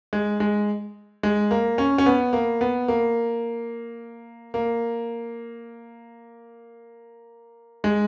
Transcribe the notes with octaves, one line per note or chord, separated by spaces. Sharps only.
G#3
G#3
G#3
A#3
C#4
C#4
B3
A#3
B3
A#3
A#3
G#3